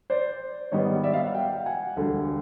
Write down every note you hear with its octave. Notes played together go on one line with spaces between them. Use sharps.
C5 D5
G#2 D#3 G3 B3 C#5 D#5
D5 E5
D#5 F5
E5 F#5
F5 G5
F#5 G#5
E1 D2 D3 G3